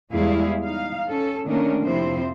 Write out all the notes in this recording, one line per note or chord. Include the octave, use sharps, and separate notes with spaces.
E2 G3 G#3 E4 G#4 F5
D#4 F5
C#4 A4
D#3 A3 A#3 C#4 D4 A#4
F2 C3 F3 C4 E4 C5